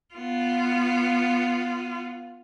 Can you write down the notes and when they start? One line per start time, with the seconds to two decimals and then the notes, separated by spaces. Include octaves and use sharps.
0.15 B3 F4